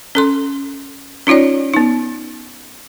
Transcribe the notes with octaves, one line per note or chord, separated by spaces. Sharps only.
C#4 A4 C6
C#4 D#4 F4 C#5 D5
B3 D#4